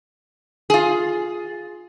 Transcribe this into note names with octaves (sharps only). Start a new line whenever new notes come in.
F4 G#4